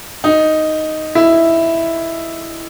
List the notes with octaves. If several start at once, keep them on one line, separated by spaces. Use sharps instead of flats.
D#4
E4